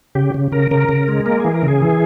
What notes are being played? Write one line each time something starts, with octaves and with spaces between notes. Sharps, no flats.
C#3 G4
C#3
C#3 A#4
C#3 A#4
C#3
G#3
A#3 A#4
E3 G#4
A#4
C#3
G#4
E3